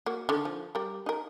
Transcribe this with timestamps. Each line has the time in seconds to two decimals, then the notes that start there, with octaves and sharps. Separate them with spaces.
0.06 A#3 F#4
0.29 D3 D#3
0.45 F3
0.75 G3 A#4
1.06 D#4 A#4